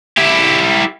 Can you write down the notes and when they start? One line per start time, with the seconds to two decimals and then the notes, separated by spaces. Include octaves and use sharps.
0.18 E4 G4